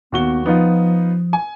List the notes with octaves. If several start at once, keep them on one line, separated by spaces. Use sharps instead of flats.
D#2 B3 F#4 G7
F3 B3 D#4 F4
G#5